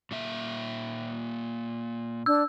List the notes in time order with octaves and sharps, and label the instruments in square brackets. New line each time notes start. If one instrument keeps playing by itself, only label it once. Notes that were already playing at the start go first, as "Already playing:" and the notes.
[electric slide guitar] A#2 A#3 E5
[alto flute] D4 [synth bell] E6